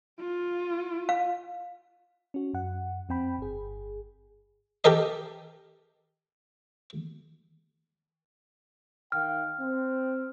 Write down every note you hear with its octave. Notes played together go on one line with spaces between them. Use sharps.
F4
F5
C#4 F#4
F#2 F#5
F2 C4 G5 B5
G1 G#4
G4 A4 A#4 D#5
D#3 F5 G5 F6
C4